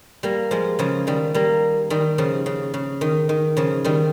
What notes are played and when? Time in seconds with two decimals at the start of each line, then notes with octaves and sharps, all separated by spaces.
0.23 G3 A#3
0.51 F3 G#3
0.79 C#3 F3
1.07 D#3 G3
1.34 G3 A#3
1.90 D#3 G3
2.18 C#3 F3
2.46 C#3
2.74 C#3
3.01 D#3
3.29 D#3
3.57 C#3 F3
3.84 D#3 G3